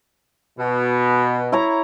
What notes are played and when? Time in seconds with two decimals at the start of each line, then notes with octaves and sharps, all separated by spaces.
0.59 B2
1.52 E4 C#5 A#5